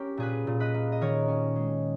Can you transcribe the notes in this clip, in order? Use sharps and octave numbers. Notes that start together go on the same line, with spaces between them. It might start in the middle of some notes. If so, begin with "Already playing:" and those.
Already playing: C#4 G4 A#4
A#2 G#4 B4
A#2
B4 D#5
A#3
D#5
D#3 A#4 C#5
C#4
G#3